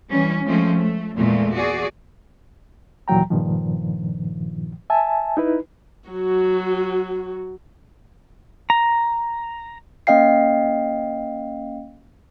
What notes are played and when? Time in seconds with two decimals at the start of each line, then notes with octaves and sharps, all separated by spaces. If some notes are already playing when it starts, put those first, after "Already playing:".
0.12 E3 G3 C#4
0.45 F3 G#3 A3 C4 C#4
0.79 A3
1.17 E2 A#2 G#3 A3
1.56 F#4 G#4 D5
3.08 D#2 A#2 E3 F#3 G5 A#5
3.30 G2 A#2 D#3 F3
4.90 E5 G#5 A5
5.37 D#4 E4 B4
6.09 F#3 F#4
8.70 A#5
10.07 A#3 C#4 D#5 F5 G5 C7